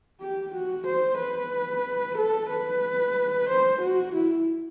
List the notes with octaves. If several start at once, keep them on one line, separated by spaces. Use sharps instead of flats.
G4
F#4
C5
B4
A4
B4
C5
F#4
E4